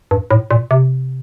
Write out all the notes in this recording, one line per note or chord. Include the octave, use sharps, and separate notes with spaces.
G2
A2
A#2
C3